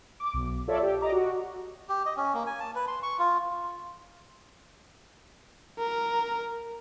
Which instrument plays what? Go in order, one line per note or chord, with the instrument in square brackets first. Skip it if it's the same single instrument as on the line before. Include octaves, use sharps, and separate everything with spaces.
[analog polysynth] D6
B1
F4 A4 C#5 D5 E5
G4
D#5 A#5 D6
F#4
[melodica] G4
D#5
C#4
A#3
G#5
A5
B4
C6
C#6
F4
[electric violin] A#4